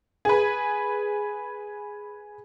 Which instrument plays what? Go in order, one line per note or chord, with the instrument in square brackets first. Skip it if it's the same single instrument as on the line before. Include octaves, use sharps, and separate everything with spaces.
[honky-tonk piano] G#4 B4